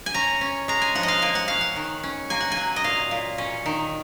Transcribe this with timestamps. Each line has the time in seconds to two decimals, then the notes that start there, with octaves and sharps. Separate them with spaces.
0.06 G#5
0.14 C#4 A#5
0.41 C#4
0.68 G#3 A#5
0.82 G#5
0.95 F3 F#5
1.03 D#5
1.08 F5
1.22 A#3 G#5
1.35 F#5
1.48 C#4 F5
1.61 F#5
1.76 D#3
2.03 C#4
2.30 A#3 G#5
2.41 F#5
2.52 G#5
2.57 F#3
2.76 D#5
2.84 A#2 F5
3.11 A#2
3.38 C#4
3.66 D#3